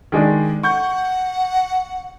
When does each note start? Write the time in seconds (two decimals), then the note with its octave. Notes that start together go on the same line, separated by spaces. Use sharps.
0.12 D#3 G#3 D4
0.63 F#5 C#6 G6